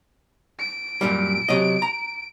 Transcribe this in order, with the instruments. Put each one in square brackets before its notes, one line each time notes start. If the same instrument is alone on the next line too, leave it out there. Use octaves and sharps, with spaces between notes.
[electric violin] D7
[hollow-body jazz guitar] F#2 A#2 G3
C3 F#3 D#5
A#5